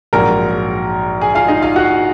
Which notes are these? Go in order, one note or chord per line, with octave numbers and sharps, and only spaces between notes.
A#1 G#2 F#3 A#4 A#5
G#4 G#5
F4 F5
D#4 D#5
F4 F5
F#4 F#5